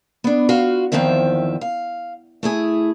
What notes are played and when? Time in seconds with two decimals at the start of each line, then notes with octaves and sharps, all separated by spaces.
0.24 B3 D4
0.49 F4 F#4 F5
0.92 E2 G2 D#3 F3 C4 E5
1.61 F5
2.43 A3 E4 G#4